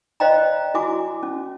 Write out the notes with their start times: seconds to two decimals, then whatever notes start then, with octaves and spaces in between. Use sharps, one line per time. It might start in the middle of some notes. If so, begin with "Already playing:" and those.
0.20 C5 D5 D#5 F5 G5 A#5
0.74 E4 F#4 G#5 D6
1.23 C#4